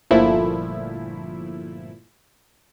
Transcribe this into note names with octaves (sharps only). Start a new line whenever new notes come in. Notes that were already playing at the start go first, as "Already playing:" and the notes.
G1 A#2 F3 A3 E4